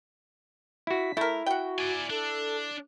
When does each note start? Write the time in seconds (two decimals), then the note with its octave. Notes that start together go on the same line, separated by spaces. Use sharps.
0.87 E4 F#4 B6
1.17 A3 E4 A#4
1.46 F#4 F#5 G5
1.79 D5 G#5
2.10 D4 A4